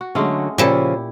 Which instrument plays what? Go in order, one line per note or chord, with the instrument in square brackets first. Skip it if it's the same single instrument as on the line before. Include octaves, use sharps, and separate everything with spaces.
[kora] F#4
[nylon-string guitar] D3 F#3 [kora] G#3 A3 C#4
[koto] A#2 A4 [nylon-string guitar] C#3 F3 [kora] E4 G4